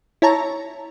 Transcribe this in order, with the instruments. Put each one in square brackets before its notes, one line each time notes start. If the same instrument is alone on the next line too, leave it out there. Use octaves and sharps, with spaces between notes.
[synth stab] E4 C#5 A5 A#5